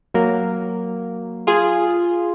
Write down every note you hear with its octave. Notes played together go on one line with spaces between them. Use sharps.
F#3 A#3
F4 G#4